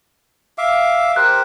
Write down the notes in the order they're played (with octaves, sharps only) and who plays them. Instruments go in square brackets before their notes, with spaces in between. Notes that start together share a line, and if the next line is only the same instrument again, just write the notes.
[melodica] E5 F5 D6
[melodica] G4 A#4 C5 [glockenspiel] F#6